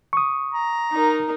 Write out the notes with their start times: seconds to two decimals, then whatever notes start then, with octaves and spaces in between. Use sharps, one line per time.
0.13 C#6 D#6
0.54 A#5
0.92 D#4 A#4